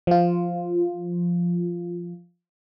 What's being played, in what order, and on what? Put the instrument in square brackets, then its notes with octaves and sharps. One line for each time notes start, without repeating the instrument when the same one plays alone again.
[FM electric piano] F3 F4